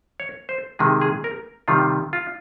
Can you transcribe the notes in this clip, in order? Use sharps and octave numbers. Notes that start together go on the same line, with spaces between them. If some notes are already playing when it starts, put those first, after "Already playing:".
C#5
C5
C3 D#3 G#3 G#4
G#4
A#4
C3 D#3 G3 F4
F4